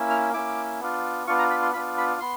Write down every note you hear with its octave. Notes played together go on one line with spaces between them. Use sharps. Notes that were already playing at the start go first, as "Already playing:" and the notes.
Already playing: A#3 C#4 E4
F6
A#3 C#4 E4 D6
B3 D4 F4
B3 D4 F4 C#6
A#5
B5
C6
B3 D4 F4 B5
B5
B3 C6